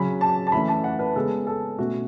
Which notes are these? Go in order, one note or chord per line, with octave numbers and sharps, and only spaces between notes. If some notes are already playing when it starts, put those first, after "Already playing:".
Already playing: C#3 F#3 C#4 B5
A5
A5
E3 A3 C#4 B5
A5
F#5
B4
C#3 G#3 B3 A4
A4
B2 A3 C#4 F#4